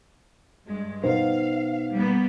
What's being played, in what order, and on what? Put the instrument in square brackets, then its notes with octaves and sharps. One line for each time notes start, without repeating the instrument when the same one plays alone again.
[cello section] G2 G#3
[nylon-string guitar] B2 D#4 C5 [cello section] F5
[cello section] G3 A#3 B3